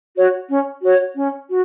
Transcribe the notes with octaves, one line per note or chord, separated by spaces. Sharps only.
F#4 C#5
C#4
F#4 C#5
C#4
F#4